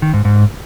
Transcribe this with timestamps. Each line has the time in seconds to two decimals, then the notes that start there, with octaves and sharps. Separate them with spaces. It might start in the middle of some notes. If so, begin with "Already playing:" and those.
0.02 D#3
0.14 G#2
0.25 G#2